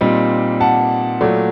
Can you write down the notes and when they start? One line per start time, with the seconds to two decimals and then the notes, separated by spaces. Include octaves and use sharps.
0.01 A#2 G3 C4 D#4
0.61 F#5 A5
1.21 A#2 F#3 A3 D5